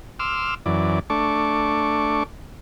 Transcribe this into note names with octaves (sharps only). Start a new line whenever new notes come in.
C6 D6 E6 F6
F#2 E3 D5
A3 D4 C#6 D6